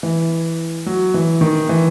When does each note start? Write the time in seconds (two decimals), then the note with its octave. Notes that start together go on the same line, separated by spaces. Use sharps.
0.03 E3
0.86 F#3
1.14 E3
1.41 D#3
1.69 E3